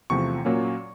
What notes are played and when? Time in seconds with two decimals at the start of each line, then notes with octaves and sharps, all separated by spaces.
0.10 E2 C3 F3 A3 C4 C#6
0.45 A#2 F#3 A#3 C#4